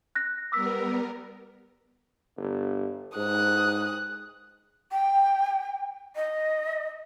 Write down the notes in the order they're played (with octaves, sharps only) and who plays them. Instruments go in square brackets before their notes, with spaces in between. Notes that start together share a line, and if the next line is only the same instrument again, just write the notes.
[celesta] F#6 A#6
[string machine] G3 B3 A#4 [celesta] D6 E6 B6
[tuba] G1
[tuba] G#2 [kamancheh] D#6 F#6
[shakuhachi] G5
D#5